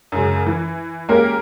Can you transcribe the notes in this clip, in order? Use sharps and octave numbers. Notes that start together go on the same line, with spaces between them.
F#2 C#3 G#3
E3
G#3 A#3 C#4 G4 A#4